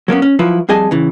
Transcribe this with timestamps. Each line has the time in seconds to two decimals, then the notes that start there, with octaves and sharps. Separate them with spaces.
0.08 F#3 A#3 B3 C#4
0.22 C#4
0.39 F3 F#3 E4 B4
0.69 F2 G3 G#4 D#5 G#5 A5
0.91 C#3 E3